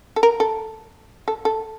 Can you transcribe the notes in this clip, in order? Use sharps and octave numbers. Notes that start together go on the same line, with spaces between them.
A4
A#4
A4
A4
A4